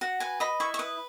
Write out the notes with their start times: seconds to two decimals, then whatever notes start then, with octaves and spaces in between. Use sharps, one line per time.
0.01 F#4 F#5
0.20 B4 G#5
0.40 D#5 B5
0.60 E4 C#6
0.74 C#6
0.79 B4 D#6